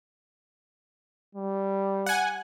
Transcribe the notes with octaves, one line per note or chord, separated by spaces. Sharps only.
G3
F#5 G#5